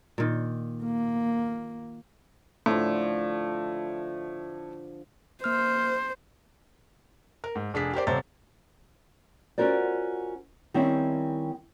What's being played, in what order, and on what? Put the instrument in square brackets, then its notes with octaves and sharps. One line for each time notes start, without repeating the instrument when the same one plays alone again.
[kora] A#2 D#3
[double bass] A#3
[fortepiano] A2 [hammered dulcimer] D3 F3
[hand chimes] A#3 F6 [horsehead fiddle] C5
[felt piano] A#4
G#2
F1 D4 G#4 B6
G4 A#4 C5 D5
D#1 C3 C5 C#5 A#5 A6
[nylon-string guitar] C#4 F4 F#4 A#4 C5 D5
D#3 G3 C4 C#4 E4